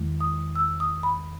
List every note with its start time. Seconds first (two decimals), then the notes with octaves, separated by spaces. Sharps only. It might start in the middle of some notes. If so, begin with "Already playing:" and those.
Already playing: E2 D#3 G#3
0.21 D#6
0.56 E6
0.80 D#6
1.03 B5